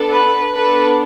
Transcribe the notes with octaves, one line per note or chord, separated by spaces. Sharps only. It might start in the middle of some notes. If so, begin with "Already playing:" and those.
Already playing: B3 D4 A4
B4
B3 D4 A4 B4